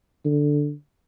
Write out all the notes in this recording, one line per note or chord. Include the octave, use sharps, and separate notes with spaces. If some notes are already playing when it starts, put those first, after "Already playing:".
D3